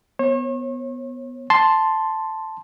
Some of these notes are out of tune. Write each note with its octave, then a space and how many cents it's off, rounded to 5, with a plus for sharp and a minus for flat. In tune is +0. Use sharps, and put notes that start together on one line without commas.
B3 +0 C#5 -40
A5 +0 C6 +0